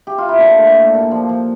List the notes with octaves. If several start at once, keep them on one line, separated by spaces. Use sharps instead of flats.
G4
F4
E4
A#2 D4
A3
A#2
A#2
F3
F3